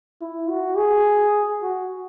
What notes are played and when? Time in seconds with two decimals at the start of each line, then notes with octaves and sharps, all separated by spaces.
0.22 E4
0.49 F#4
0.77 G#4
1.62 F#4